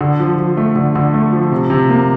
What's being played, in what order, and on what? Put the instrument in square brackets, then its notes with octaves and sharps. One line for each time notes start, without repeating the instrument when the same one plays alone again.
[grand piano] D3
F3
F3
A3
D3
D3
A3
F3
C3
C3
A#3